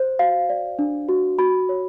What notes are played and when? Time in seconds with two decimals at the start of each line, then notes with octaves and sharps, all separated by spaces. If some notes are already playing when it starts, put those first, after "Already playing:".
Already playing: C5
0.19 F#4 F5
0.49 D5
0.79 D4
1.09 F#4
1.39 F#4 B5
1.69 C#5